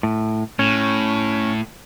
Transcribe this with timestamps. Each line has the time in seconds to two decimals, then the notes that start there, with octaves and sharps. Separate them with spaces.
0.03 A2
0.59 A2 C#4